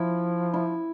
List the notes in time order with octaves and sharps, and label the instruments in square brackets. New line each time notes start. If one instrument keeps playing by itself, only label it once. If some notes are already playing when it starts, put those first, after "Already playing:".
Already playing: [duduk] F3 [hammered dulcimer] E4
[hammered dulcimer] E4